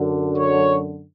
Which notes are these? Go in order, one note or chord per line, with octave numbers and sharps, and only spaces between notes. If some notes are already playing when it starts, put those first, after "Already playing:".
Already playing: F#2 D3
C#5